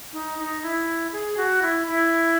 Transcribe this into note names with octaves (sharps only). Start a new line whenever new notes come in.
D#4
D#4
E4
G#4
F#4
E4
E4